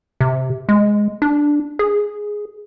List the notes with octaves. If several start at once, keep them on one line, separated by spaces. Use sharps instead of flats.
C3
G#3
D4
G#4